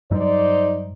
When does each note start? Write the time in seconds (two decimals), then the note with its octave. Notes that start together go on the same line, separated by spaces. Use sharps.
0.11 G2 F#3 G3 D#4 C5 D5